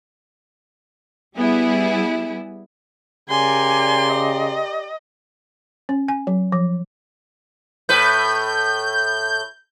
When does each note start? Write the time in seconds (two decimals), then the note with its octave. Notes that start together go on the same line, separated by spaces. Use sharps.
1.35 G3 B3 E4 G#4
3.30 C#3 G4 A#4 D5 G#5 C6
4.12 D#5
5.89 C#4
6.08 G#5
6.27 F#3
6.52 F3
7.89 A2 B4 G6